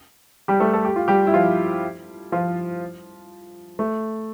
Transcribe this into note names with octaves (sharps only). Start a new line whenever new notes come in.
G3 G4
A3 A4
A4
G4
F4
G3 G4
E4
F3 F4
F3 F4
A3